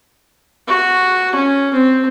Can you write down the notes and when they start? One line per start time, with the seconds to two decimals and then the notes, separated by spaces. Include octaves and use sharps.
0.68 F#4
1.35 C#4
1.74 C4